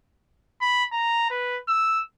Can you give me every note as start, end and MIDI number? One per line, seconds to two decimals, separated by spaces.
0.61 0.84 83
0.92 1.30 82
1.31 1.59 71
1.68 2.01 88